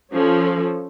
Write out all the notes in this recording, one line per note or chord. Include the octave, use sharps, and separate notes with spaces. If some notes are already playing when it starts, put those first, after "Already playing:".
F3 C#4 A4